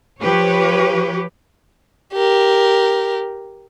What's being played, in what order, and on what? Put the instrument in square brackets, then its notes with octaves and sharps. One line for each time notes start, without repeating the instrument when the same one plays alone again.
[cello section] F3 G4 B4 C#5
[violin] G4 A#4